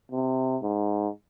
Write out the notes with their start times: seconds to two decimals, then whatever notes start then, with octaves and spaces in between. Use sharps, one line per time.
0.11 C3
0.62 G#2